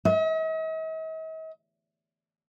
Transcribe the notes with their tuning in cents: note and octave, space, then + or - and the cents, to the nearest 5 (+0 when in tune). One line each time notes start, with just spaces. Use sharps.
D#5 +45